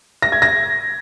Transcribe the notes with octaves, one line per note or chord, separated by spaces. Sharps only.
A#6
G#6
A#6